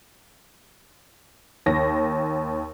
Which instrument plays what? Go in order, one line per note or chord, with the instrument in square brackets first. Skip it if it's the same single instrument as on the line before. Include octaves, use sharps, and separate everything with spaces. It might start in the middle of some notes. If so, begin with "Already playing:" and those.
[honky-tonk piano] D#2 A#6